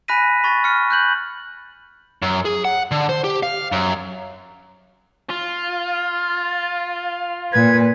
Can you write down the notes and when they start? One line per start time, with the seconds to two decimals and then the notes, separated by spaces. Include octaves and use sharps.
0.08 G#5 B5 F#6 A#6 B6 D#7
0.44 B5 C#6 A6
0.64 F6 C#7
0.90 F#6 G6 F#7
2.22 F#2
2.45 G#4
2.65 F#5
2.91 D3
3.09 C5
3.24 G4
3.43 F5
3.72 F#2
5.30 F4
7.53 A#2 B4 G#6